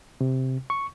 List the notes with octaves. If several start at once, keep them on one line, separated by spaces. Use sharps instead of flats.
C3
C#6